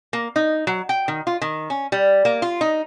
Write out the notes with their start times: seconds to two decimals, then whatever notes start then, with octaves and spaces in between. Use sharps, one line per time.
0.13 A#3
0.36 D#4
0.67 F#3
0.89 G5
1.08 D#3
1.27 F4
1.42 D#3
1.70 C#4
1.92 G3
2.25 A#3
2.42 F4
2.61 D#4